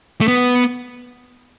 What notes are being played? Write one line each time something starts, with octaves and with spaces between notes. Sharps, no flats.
A3
B3